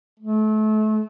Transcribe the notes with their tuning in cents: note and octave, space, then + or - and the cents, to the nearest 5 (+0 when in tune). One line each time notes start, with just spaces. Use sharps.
A3 -30